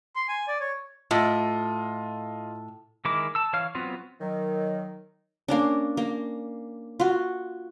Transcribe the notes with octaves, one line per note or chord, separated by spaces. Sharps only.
C6
G#5
D5
C#5
A2 F4 D#5
D#3 G#3 E4 A#4 D6
A5 E6
E3 C#5 F5 F6
F#3 B3 C4 F4
D#3 F#3
A#3 C#4 D4
A#3
F4 F#4